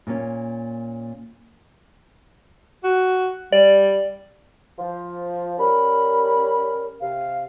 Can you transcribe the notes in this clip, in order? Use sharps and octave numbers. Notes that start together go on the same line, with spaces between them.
A#2 A#3 C#4
F#4
G3 D5
F3
G3 C#4 A#4 B5
C3 F5